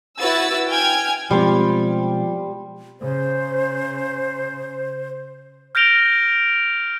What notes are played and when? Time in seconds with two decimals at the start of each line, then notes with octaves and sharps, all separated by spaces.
0.19 E4 F#4 B4 E6 A6
0.68 G5 G#5 F6 G#6
1.31 B2 F3 G3 G#3 C4 C6 D6
3.01 C#3 C5
5.75 F6 G6 A#6 D7 F7 G7